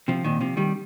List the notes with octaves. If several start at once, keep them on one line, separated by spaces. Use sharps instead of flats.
C3 F3
A#2 D#3
C3 F3
D#3 G3